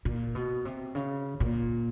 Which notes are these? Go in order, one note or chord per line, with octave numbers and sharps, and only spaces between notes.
A#2
B2
C3
C#3
A#2